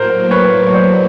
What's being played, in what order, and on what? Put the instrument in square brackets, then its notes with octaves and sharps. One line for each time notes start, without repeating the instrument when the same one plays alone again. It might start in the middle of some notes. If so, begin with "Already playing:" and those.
Already playing: [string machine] A2 F#3 A#3 [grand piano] A#4 C5
[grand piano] B4 C#5
C#5
C5 D5